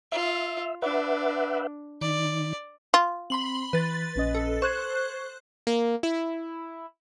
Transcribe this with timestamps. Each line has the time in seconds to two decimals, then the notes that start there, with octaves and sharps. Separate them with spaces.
0.12 F4 E5
0.82 D4 B4 E5 F#5
2.01 D#3 D5
2.94 F4
3.30 C4 B5 C6 F#7
3.73 E3 B4 A6
4.16 A#1 C#4 D#5
4.35 A4
4.62 C5 C#6 F#6 G#6
5.67 A#3
6.03 E4